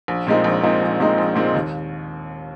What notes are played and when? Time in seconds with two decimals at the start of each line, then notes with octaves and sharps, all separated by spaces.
0.08 A#1
0.27 A#2 G#3 C4 D#4
0.44 A#1
0.63 A#2 G#3 C4 D#4
0.82 A#1
1.00 A#2 G#3 C4 D#4
1.18 A#1
1.35 A#2 G#3 C4 D#4
1.55 D#2